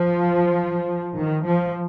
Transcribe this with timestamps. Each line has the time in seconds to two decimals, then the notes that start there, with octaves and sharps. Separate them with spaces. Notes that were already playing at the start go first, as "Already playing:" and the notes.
Already playing: F3
1.16 D#3
1.44 F3